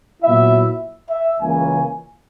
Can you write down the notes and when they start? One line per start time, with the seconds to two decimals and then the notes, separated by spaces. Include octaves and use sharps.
0.22 A#2 F#3 B3 E4 E5
1.10 E5
1.39 C#2 C#3 E3 A#3 C#4 G#5